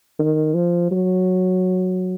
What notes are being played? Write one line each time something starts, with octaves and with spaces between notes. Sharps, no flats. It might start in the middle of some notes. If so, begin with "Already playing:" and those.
D#3
F3
F#3